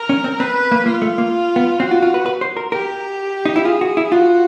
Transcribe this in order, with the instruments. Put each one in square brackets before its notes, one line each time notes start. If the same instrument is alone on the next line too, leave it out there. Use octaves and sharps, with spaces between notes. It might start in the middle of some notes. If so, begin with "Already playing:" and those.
Already playing: [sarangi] A#4
[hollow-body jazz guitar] C#4
C4
[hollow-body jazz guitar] C4 [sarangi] B4
[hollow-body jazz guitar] A#3
[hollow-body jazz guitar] A#3 [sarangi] F4
[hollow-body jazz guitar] A3
A#3
B3
[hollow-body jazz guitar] C4 [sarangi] F#4
[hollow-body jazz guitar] F4
F4
B4
B4
C5
A#4
[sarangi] G4 [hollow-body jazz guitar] A#4
[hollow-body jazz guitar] D#4
E4
[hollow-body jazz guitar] F4 [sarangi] G#4
[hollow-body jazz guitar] F#4
E4
[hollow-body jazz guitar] F4 [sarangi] F#4